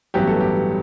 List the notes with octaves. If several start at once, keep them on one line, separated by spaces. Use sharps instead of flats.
A1 G2 F#3 B3 G4
A4
G4